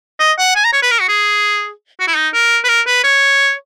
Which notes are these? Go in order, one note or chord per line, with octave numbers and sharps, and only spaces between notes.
D#5
F#5
G#5
A#5
C#5
B4
A#4
F#4
G#4
F#4
E4
D#4
A#4
B4
A#4
B4
C#5